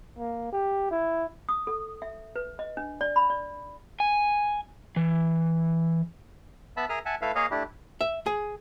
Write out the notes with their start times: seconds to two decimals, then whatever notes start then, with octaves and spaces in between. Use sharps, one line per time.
0.19 A#3
0.53 G4
0.91 E4
1.49 D#6
1.67 A4
2.02 E5
2.36 B4
2.59 D#5
2.77 D4
3.01 D5
3.16 B5
3.30 D5
4.00 G#5
4.96 E3
6.77 B3 E5 A5 B5
6.89 G#4 A#4 E5 D#6 F6
7.06 E5 F#5 G#5 A5
7.22 A3 E4 A4 B4 E5 F5
7.35 A#3 G#4 C#5 D#5 F5
7.51 A3 D4 E4 G4
8.01 E5
8.26 G#4